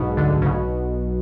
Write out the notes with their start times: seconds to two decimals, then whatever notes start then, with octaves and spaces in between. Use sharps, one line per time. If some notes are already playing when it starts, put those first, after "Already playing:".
Already playing: B1 G#2 B2
0.17 D2 D3
0.42 C#3
0.46 B1 B2